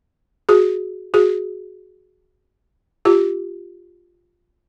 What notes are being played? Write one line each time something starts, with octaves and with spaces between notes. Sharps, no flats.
F#4 G#4
F#4 G#4
F4 G4